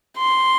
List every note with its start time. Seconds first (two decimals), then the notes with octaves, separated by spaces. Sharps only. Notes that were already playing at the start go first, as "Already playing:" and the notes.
0.17 C6